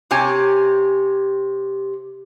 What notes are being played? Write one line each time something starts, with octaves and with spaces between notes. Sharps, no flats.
C3 G4 C#5 G#5